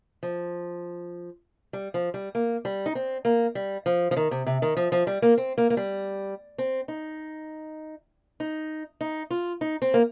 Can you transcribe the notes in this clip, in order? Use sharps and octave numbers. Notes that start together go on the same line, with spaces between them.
F3
G3
F3
G3
A#3
G3
D#4
C4
A#3
G3
F3
F3
D#3
C3
C3
D#3
F3
F3
G3
A#3
C4
A#3
A#3
G3
C4
D#4
D#4
D#4
F4
D#4
C4
A#3